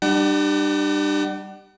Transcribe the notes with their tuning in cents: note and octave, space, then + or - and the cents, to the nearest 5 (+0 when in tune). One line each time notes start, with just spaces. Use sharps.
G3 +0 D4 +35 F#5 +40